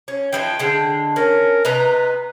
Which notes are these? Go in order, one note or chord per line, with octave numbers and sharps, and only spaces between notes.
C#4
E3 F3 D#4 G5
D3 G#3
C#4 A#4
C3 B4 D#5 A#5